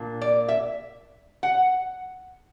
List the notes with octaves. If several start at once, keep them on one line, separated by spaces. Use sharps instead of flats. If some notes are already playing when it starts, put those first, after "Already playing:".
Already playing: A#2 A#3 D4
D5
E5
F#5